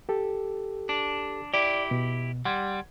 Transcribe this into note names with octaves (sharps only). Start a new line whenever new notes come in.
G4 A4
D4
E4 G4 D5
B2
G3 F#5 C6 G#6